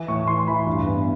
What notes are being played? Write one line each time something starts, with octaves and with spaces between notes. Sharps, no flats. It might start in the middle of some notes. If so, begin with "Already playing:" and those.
Already playing: E3 G#5
A2 C#6
E3 C6
E3 B5
G2
B3